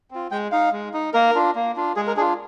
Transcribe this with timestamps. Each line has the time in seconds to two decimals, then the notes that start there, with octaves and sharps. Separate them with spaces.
0.11 C4 F4
0.31 G#3 G5
0.52 D#4 F5
0.72 G#3
0.94 D#4
1.14 A#3 A#4
1.35 D4 F4
1.55 A#3
1.76 D4 F4
1.96 G#3 G#4
2.07 A#4
2.16 D4 G#4
2.20 F4